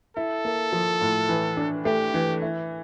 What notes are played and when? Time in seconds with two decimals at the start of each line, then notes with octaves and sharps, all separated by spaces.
0.17 E4 A4
0.45 A#3
0.73 F3
1.01 A2
1.29 E3
1.57 D4
1.85 A3 G4
2.14 E3
2.42 E4